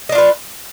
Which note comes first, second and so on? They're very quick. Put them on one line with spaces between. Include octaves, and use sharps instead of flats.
D#5 D4 F4 B4